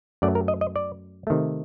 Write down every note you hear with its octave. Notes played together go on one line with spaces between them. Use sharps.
F#2 F#3 A3 D5
A#4
D#5
D#5
D5
C3 D#3 A3